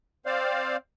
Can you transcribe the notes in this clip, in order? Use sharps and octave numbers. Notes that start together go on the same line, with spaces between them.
C4 C5 D5 F5